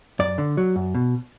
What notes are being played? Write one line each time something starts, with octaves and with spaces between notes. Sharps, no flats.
F#2 D5
D3
F#3
F#2
B2